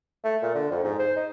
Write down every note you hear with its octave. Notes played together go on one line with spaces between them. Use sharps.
A3
A#2
D3
F2
G#2
C5
D#4